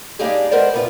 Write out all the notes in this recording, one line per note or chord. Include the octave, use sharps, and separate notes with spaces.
G3 A#3 D4 D#4 G4 G#4
G#3 B3 A#4 C5 D5
C3 B3 F4